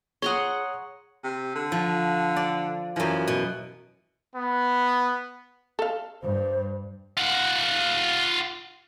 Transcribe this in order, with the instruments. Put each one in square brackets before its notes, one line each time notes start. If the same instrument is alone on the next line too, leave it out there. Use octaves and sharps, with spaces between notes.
[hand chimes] G#4 [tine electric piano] C#5 D#6 [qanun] F#5 A#5 C6
[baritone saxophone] C3
D3
[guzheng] F3
D5
[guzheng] F#2 E3 [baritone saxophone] F3
[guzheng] B2
[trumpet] B3
[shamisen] A4 F5
[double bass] G2 [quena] C5
[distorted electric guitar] F4 F#5